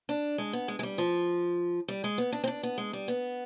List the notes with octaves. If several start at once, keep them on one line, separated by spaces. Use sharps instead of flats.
D4
G#3
B3
G#3
G#3
G3
F3
G3
G#3
B3
D4
C4
D4
B3
G#3
G3
B3